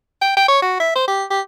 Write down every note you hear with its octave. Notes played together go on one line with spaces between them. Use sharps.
G5
G5
C#5
F#4
E5
C5
G4
G4